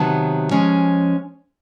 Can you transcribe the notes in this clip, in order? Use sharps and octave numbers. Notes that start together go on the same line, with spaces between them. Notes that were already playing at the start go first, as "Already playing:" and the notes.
Already playing: C3 D#3 F#3 B3 A5
F3 G#3 C#4